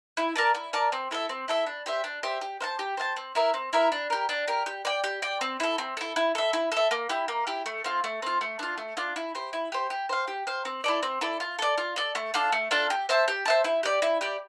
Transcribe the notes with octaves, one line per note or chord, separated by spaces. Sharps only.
E4
A#4 D5 A5
E4
A#4 D5 A5
C4
E4 A4 E5
C4
E4 A4 E5
D4
G4 C5 E5
D4
G4 C5 E5
G4
C5 F5 A5
G4
C5 F5 A5
C4
E4 A#4 E5
C4
E4 A#4 E5
D4
G4 A#4
D4
G4 A#4
G4
D5 G5
G4
D5 G5
C4
E4 A4
C4
E4 A4
E4
A4 E5
E4
A4 E5
A#3
E4 G4
A#3
E4 G4
A3
C4 F4
A3
C4 F4
A3
D4 F4
A3
D4 F4
E4
G4 C5
E4
G4 C5
G4
C5 F5
G4
C5 F5
C4
E4 A4 D5
C4
E4 A4 D5
F4
A4 D5
F4
A4 D5
A3
D4 F4 A4
A3
D4 F4 A4
G4
C5 E5 A5
G4
C5 E5 A5
E4
G4 D5
E4
G4 D5